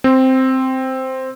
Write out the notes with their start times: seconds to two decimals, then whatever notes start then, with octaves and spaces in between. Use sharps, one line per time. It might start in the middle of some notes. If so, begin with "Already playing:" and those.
0.04 C4